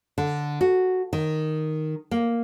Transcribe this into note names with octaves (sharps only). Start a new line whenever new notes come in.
D3
F#4
D#3
A#3